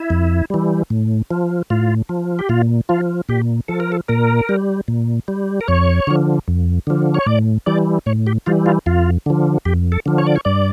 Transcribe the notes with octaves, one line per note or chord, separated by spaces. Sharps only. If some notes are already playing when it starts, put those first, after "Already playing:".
Already playing: E4
F2
E3 G3
A2
F3
A2 F4
F3
G4
A#2 F4
F3 F4
A#2 G4
F3 A4
A#4
A4
A#2 A#4
G3
A#2
G3
A#4
F2 C#5
D3 F3
F2
D3 F3
C#5
A2 D5
E3 G3 D5
A2 C#5
G4
E3 G3 F4
F4
F2 F4
D3 F3
F2 G4
A4
D3 F3
C#5
D5
C#5
G2 D5